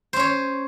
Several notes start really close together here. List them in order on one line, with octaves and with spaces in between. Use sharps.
C5 C#4 C#5